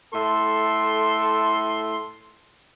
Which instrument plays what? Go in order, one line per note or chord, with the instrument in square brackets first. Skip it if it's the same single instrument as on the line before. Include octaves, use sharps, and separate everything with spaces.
[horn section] A2 A4 E5 C6